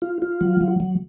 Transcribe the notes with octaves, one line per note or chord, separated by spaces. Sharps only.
F4
F4
F#3
F#3
F#3